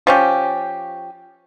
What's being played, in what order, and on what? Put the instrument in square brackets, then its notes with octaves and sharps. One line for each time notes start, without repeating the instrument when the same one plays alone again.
[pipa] F3 C#4 G4